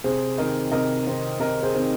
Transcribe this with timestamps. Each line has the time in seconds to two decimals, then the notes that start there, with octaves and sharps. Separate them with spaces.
0.04 C3 G#4 C5
0.38 D#3 C4 D#4 A#4 D#5
0.71 C3 A#4 D#5
1.07 D#3 C4 D#4
1.39 C3 A#4 D#5
1.63 G#4 C5
1.74 D#3 C4 D#4